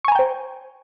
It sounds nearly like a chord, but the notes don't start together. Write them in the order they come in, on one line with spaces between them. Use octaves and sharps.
C#6 G#5 A#5 G5 C5